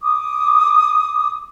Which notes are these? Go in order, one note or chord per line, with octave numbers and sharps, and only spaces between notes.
D6 D#6